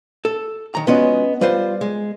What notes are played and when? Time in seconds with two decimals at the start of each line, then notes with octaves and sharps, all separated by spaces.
0.25 A4
0.75 D#3 A#5
0.87 G#3 B3 C#4 F4 F#4 D#5
1.41 G3 F4 B4 C5
1.81 G#3